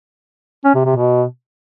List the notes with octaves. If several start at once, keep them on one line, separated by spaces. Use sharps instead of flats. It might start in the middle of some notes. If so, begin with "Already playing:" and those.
C#4
C3
C3
B2